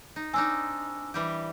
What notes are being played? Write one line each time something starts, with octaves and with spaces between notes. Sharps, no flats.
D#4
C4 D4 D#4 G#5 E6
E3 G3 G4